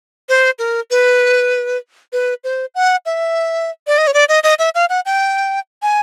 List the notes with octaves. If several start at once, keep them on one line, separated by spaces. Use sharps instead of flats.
C5
A#4
B4
B4
C5
F#5
E5
D5
D#5
C#5
D5
D#5
D#5
E5
F5
F#5
G5
G#5